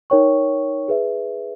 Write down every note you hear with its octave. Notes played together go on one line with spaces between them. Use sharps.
D#4 A#4 C#5 G5 C#6
G#4 B4 E5